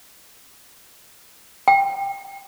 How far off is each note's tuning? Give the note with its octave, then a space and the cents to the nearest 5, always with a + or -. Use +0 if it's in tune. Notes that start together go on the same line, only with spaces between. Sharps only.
G5 +15